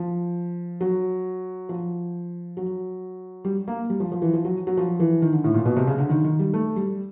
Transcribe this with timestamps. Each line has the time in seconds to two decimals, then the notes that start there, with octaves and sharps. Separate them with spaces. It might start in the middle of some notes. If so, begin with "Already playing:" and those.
Already playing: F3
0.81 F#3
1.69 F3
2.57 F#3
3.45 G3
3.68 A#3
3.90 G3
4.00 F3
4.12 F3
4.22 E3
4.33 F3
4.45 F#3
4.67 F#3
4.77 F3
5.00 E3
5.22 D#3
5.33 D3
5.44 A2
5.54 A#2
5.65 B2
5.77 C3
5.87 C#3
5.98 D3
6.10 D#3
6.24 D#3
6.39 G3
6.54 A3
6.76 G3